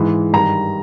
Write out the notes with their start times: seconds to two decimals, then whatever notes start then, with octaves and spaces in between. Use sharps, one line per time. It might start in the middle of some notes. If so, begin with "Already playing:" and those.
Already playing: G#2 E3
0.33 G2 D#3 A#5